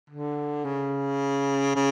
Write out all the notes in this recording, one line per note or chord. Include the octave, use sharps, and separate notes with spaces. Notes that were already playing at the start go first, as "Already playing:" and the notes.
D3
C#3
C#3